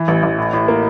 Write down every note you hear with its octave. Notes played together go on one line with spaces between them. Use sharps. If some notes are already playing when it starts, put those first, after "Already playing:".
Already playing: E3
A1
A1
A2
A2
A#3